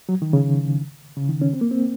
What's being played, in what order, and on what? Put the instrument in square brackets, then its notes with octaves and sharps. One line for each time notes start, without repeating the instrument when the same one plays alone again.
[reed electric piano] F#3
D#3
C#3
C#3
D#3
C#4
C4
A#3
C4